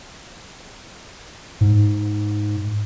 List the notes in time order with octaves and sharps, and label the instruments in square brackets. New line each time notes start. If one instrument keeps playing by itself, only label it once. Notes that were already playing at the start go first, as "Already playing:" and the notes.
[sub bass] G#2